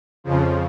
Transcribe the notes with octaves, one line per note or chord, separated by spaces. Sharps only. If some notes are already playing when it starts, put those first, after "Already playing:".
F2 C#3 F3